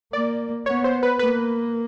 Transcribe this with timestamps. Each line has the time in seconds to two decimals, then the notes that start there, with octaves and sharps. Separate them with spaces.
0.13 A#3 D5
0.66 B3 C#5
0.84 C5
1.03 B4
1.19 A#3 B4